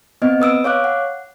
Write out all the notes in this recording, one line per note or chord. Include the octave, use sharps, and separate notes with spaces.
B3 C4 D#5
B4 D#6 E6 D7
C#5 F5 D6 F#6
F#5